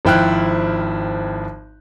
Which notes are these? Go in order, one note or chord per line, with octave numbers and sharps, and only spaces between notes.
G#1 F3 E4 G5 F6 F#6